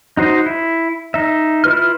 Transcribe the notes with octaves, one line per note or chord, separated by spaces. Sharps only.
D#4 F#4 C5 D#5
E4
D#4 E5
E4 F4 B4 F6